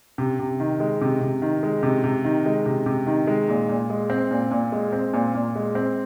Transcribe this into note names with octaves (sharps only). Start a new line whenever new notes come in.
C3
C3
D#3
G#3
C3
C3
D#3
G#3
C3
C3
D#3
G#3
C3
C3
D#3
G#3
A#2
A#2
G#3
C4
A#2
A#2
G#3
C4
A#2
A#2
G#3
C4